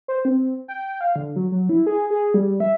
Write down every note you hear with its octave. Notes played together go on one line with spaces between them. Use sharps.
C5
C4
G5
F5
D3
F#3
F#3
E4
G#4
G#4
G3
E5